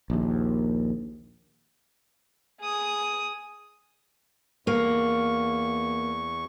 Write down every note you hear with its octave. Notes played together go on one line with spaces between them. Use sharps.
A#1 D#2
G#4 D#6
E2 A#3 C#6